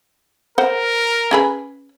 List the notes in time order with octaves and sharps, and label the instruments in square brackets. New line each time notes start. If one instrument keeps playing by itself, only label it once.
[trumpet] A#4 [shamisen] C5 F#5
[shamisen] C#4 G#4 B4